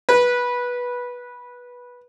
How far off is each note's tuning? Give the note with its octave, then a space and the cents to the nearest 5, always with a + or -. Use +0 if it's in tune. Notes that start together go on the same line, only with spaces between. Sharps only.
B4 -15